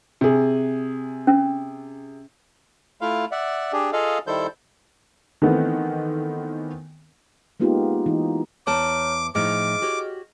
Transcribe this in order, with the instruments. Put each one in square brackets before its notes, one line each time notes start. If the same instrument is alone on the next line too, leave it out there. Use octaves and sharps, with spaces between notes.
[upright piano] C3 G#4
[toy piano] C#4
[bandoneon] A3 E4 F4 F5
D5 E5 F#5
D4 G4 G#4
F4 G#4 A4 D#5 F5
D#3 G3 E4 A4 C5 G6
[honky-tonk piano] D#3 E3 A3 B3 C4
[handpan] G#3 A#3 B3 D#4 F4 G4
E3 D#4
[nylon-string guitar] E2 D5 A5 [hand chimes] C#5 A#5 F6 [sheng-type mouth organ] D6
[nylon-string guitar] A2 F3 D#4 [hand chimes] G#4 D#5 F6 [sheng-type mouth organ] D6
[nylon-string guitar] F#4 G4 C#5